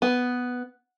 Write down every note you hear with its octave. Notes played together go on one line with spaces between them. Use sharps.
B3